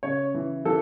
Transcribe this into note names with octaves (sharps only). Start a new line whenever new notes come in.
C#3 C#5
E3
E3 A4